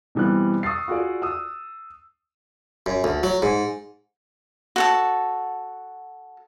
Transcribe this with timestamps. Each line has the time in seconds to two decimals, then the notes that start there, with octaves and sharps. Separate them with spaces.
0.15 B2 E3 G3 C4 F#6
0.63 C#6 D#6 E6 A6 C7
0.88 F4 F#4 G#4 D5
1.22 D#6 E6
2.86 F#2
3.04 D2
3.23 F#3
3.42 G#2
4.76 F#4 A4 A5